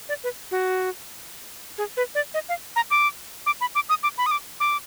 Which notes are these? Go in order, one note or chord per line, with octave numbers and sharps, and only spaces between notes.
D5
B4
F#4
G#4
B4
D5
D#5
F5
A#5
D6
D6
B5
D6
D#6
D6
B5
D#6
D6
D6